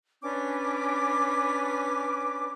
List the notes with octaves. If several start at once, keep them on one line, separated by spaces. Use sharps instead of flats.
C#4 D4 B4 D6